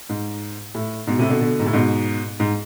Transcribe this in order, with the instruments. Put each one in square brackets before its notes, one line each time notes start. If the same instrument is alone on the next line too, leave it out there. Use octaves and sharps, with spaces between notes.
[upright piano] G#2
A2
G#2 B2
A2 C3
B2 D3
B2 D3
G#2
A2
G#2 B2
G#2